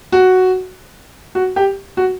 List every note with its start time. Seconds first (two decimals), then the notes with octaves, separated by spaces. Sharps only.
0.12 F#4
1.35 F#4
1.56 G4
1.97 F#4